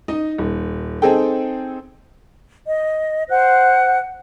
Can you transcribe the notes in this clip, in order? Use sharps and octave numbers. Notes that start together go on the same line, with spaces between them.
D#4 D#5
D#1
C4 D#4 G#4 A4 G5
D#5
C5 F#5 F#6